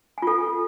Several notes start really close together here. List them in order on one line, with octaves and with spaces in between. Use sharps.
G#5 F4 A4